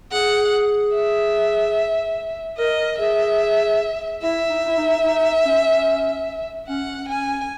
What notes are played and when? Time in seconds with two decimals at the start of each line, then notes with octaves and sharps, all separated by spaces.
0.12 G#4 F#5
0.94 E5
2.58 A#4 D#5
2.99 G#4 E5
4.22 E4 E5
4.49 D#4
4.68 E4
4.77 D#4
5.04 D#4
5.45 C#4
6.68 C#4 F#5
7.09 C#4 G#5